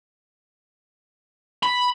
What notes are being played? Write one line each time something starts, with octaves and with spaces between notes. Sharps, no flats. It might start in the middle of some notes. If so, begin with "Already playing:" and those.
B5